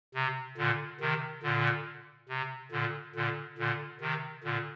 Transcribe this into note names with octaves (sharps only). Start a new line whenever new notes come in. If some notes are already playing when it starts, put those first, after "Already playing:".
C3
A#2 D3
C3 D#3
A#2 D3
C3
A#2 D3
A#2 D3
A#2 D3
C3 D#3
A#2 D3